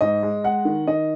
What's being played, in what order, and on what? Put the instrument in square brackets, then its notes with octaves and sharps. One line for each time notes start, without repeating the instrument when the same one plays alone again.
[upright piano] G#2 D#5
G#3
G#3 F#5
D#3
D#3 D#5